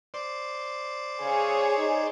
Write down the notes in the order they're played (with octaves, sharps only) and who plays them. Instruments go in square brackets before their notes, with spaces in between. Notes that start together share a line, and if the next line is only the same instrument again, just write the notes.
[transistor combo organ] C5 D5
[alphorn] C#3 [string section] G#4 C#5
[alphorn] D#4